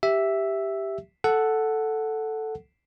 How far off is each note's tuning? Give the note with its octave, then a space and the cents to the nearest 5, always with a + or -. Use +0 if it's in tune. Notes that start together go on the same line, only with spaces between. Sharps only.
G4 +0 E5 +0
A4 +0 F#5 +0